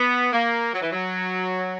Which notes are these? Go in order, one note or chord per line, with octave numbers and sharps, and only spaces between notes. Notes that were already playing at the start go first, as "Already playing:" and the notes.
Already playing: B3
A#3
F#3
E3
F#3